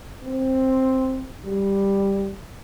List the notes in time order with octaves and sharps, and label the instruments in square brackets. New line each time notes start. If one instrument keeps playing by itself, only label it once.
[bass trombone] C4
G3